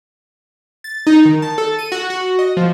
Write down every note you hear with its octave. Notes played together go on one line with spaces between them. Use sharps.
A6
D#4
D#3
A5
A4
D#7
F#4
F#4
D#5
F3